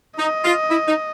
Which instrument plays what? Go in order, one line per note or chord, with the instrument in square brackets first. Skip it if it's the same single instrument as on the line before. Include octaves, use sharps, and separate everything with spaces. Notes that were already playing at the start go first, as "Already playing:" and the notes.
[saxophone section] D#4 [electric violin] D#5
[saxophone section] F4
E4
D#4